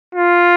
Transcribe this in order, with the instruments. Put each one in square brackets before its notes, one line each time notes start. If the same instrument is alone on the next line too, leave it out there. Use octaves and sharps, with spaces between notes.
[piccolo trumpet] F4